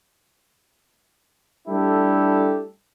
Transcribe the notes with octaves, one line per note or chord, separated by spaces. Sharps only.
G3 A3 D4 E4 G4 A4